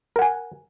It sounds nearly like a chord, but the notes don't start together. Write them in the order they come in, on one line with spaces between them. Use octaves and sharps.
A#4 F#5 G#5